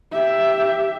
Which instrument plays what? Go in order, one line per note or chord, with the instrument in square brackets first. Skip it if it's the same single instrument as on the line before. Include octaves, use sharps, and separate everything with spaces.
[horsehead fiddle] G4 E5